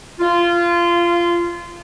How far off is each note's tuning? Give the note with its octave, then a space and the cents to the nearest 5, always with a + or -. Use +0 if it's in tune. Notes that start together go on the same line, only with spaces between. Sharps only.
F4 -20